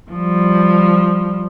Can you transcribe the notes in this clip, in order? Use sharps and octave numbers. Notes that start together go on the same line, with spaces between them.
F3 G3